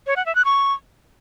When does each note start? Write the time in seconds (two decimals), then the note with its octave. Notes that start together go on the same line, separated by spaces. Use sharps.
0.07 C#5
0.16 F#5
0.26 E5
0.35 F#6
0.45 C#6